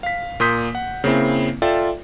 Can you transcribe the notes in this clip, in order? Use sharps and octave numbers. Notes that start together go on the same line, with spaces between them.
F5 B6
A#2 A#3 C6 D#6 G6 B6
F#5
C#3 A#3 C4 E4
F4 A4 D5 E5 G5